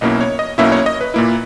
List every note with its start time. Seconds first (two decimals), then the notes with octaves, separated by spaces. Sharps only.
0.01 B1 B2 A#3 C#4 E4 D#5
0.21 C#5
0.39 D#5
0.58 B1 B2 A#3 C#4 E4 E5
0.72 C#5
0.86 D#5
1.01 B4
1.14 A#2 A#3 E4